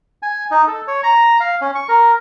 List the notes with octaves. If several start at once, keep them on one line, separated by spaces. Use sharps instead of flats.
G#5
D#4
A4
C#5
A#5
F5
C#4
C#6
A#4